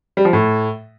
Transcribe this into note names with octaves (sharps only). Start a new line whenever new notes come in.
G3
F3
A2